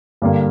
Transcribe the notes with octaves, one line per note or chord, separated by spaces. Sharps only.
G2 D3 G3 A#3